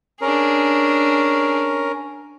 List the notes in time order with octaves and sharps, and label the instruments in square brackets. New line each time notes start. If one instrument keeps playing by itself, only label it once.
[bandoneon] C#4 A#4 [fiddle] D4 G#4